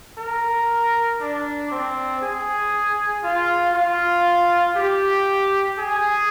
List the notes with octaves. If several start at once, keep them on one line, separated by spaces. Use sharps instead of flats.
A#4
D4
C4
G#4
F4
F4
G4
G#4